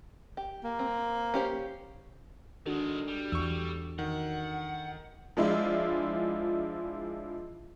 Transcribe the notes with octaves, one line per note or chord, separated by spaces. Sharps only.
G4
A#3
C4
C#4 G4 C5
D#3 G#3 D4 F#4 A4
G3
E2 C#6 E6
D#3 F#5
F3 G#3 D4 E4 F4